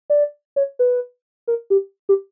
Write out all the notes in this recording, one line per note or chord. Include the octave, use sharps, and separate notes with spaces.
D5
C#5
B4
A#4
G4
G4